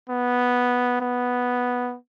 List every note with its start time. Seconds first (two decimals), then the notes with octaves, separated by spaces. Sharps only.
0.10 B3
1.01 B3